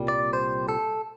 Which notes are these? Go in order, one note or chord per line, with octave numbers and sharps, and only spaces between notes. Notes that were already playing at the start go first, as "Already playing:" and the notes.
Already playing: C2 A#2 G3
D5
C5
A4